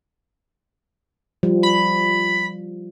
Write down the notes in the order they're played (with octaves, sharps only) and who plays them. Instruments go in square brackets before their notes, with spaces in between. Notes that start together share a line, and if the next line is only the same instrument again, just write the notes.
[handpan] F3 G3
[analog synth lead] B5